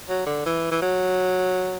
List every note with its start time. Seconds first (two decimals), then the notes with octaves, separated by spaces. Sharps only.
0.09 F#3
0.26 D3
0.46 E3
0.71 E3
0.82 F#3